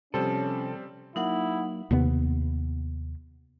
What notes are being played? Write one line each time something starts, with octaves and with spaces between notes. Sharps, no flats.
C3 F3 G3 C4 C#4 A4
F#3 A#3 D#4 E4 F#5
D#2 C3 B3